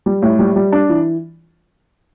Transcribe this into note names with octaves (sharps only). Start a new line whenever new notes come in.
G3
A2
G3
G3
D4
E3